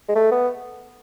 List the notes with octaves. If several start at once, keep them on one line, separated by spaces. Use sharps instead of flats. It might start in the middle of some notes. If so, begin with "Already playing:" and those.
G#3
A3
B3